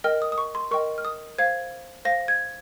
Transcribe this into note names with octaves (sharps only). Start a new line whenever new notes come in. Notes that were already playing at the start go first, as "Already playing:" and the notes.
A#4 D#5 G5 F6
D#6
D#6
C#6
C6
A#4 D#5 G5 C#6
F6
D#6
C5 F5 G#6
C5 F5 A#6
G#6